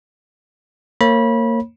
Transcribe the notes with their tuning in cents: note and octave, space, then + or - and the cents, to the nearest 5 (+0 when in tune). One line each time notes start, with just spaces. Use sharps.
A#3 -25 C#5 -30 B5 -25